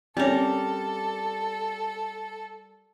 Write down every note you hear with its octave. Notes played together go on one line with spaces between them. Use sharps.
G3 C4 C#4 A4 A#4 C#5